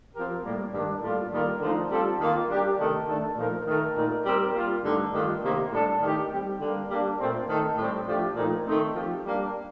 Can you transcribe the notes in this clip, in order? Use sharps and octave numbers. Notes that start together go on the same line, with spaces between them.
F3 C4 G4 A#4
A2 G3 A#3
G2 D#3 G3 D4
A2 G3 A#3 F4 A4
D#3 G3 A#3 F4 A#4
D3 F3 A3 D#4
G3 C4 F4 A4
D#3 A#3 F4
G3 D4 G4 A#4
C3 D#3 A3 D4 A4
D#3 A3 D4 A4
A#2 F3 A3 D#4 A#4
D#3 A3 D#4 A#4
A#2 A3 D#4 A#4
G3 C4 G4 A#4
G3 A#3 F4
G2 D3 A3 D#4
G2 D#3 A3 D4 F4
C3 D#3 A#3
A2 G3 D4 A4
D#3 A3 D#4 G4
G3 C4 G4
D3 G3 A#3
G3 A#3 D4
A#2 A3 C4
D#3 A3 D#4 A4
A2 G3 C4
F3 A3 D4 G4
A#2 F3 A3 D#4
D#3 A3 C4 D#4
F3 C4 G4
G3 A#3 D4